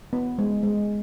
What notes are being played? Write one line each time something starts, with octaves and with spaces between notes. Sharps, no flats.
B3
G#3
G#3